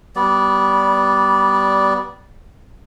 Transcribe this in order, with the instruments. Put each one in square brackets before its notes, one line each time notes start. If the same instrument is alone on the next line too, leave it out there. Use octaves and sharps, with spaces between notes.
[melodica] G3 B3 D5